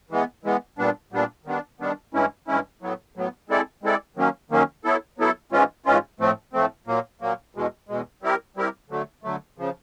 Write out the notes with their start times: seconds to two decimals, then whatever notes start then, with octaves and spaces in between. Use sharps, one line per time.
0.11 E3 G#3 B3
0.44 E3 G#3 B3
0.78 A#2 G3 B3 D4
1.12 A#2 G3 B3 D4
1.45 D#3 G3 B3 D4
1.80 D#3 G3 B3 D4
2.13 G2 E3 G#3 C#4 E4
2.48 G2 E3 G#3 C#4 E4
2.81 A2 F#3 B3
3.16 A2 F#3 B3
3.49 G#3 C4 E4 A4 D5
3.83 G#3 C4 E4 A4 D5
4.16 D#3 F#3 A#3 C#4
4.50 D#3 F#3 A#3 C#4
4.84 F#3 B3 E4 A4
5.18 F#3 B3 E4 A4
5.52 G#2 E3 G#3 C#4 F4
5.86 G#2 E3 G#3 C#4 F4
6.20 A2 F3 A3 C4
6.53 A2 F3 A3 C4
6.87 A#2 F#3 A#3
7.21 A#2 F#3 A#3
7.55 E2 B2 G#3
7.89 E2 B2 G#3
8.22 G3 C4 E4 G4 A#4
8.57 G3 C4 E4 G4 A#4
8.90 D3 F#3 A3
9.23 D3 F#3 A3
9.58 C#3 F3